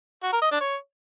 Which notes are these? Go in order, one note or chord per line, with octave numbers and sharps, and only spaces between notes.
F#4
A#4
D#5
D4
C#5